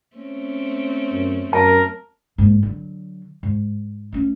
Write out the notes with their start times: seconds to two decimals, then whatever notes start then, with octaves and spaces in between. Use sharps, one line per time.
0.16 A3 C4 C#4
1.12 F#2
1.53 F#2 A#4 A5
2.38 G#2 A#3
2.63 D3 F#3
3.43 G#2
4.12 A3 C#4